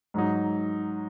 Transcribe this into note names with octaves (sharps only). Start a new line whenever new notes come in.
G#2 F#3 D#4